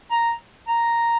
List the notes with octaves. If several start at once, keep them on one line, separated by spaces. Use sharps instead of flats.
A#5
A#5